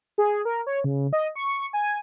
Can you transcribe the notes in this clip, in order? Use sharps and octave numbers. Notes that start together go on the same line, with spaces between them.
G#4
A#4
C#5
C#3
D#5
C#6
G#5